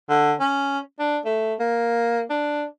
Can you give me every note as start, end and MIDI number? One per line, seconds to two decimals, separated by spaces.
0.10 0.34 50
0.40 0.79 61
1.00 1.18 62
1.25 1.54 57
1.60 2.22 58
2.30 2.64 62